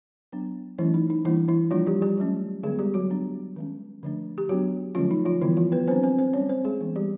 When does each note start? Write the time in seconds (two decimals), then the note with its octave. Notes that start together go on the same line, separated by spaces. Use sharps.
0.32 F#3 B3 D4
0.78 E3 F#3 A3 C#4 E4
0.94 D#4
1.10 D#4
1.25 E3 G3 A#3 D4 E4
1.48 E3 E4
1.71 F3 G3 A#3 D4 F4
1.86 G3 G4
2.02 G3 G4
2.18 F#3 A3 C#4
2.63 D3 F#3 G#3 B3 G#4
2.79 G3 G4
2.94 F#3 F#4
3.10 F#3 B3 D4
3.56 D#3 G#3 C#4
4.03 D3 F3 A3 D4
4.38 G4
4.49 F#3 B3 D4 F#4
4.95 D3 F3 F#3 A3 C#4 F4
5.11 D#4
5.26 F3 F4
5.41 D3 E3 G3 B3 E4
5.57 F3 F4
5.72 B3 B4
5.87 F#3 B3 C4 D4 C5
6.03 C4 C5
6.18 C4 C5
6.33 G3 A#3 C#4 C#5
6.49 C4 C5
6.65 G#3 G#4
6.81 E3 G#3 B3 D4
6.96 G3 G4